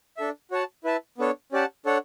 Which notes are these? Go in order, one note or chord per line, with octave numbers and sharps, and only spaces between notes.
D4 A4 E5
F#4 C#5 F#5 A5
E4 B4 E5 A5
B3 D4 A4 C#5
C#4 G4 D5 F#5 A5
D4 A4 C#5 F#5